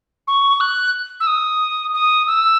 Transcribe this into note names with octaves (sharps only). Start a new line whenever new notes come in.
C#6
F#6
E6
D#6
D#6
E6